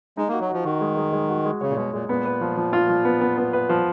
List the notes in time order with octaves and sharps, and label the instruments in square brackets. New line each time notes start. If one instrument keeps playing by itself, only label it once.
[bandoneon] G#3 [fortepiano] D#4
[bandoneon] A#3 [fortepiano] F#4
[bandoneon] F#3
[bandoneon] F3 [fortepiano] F#4
[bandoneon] D#3 [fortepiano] F#4
[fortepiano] G#3
G#3
G#3
F#4
G#3
[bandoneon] C#3 [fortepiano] C#5
[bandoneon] A#2
[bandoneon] B2 [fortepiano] G#3
[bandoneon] A#2 [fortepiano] G#3
[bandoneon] A#2 [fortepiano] B3
[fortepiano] B4
F3
F3
F4
F3
B3
B3
B3
B4
F3